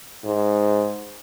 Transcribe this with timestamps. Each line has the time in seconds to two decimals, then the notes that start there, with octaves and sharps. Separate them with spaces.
0.25 G#2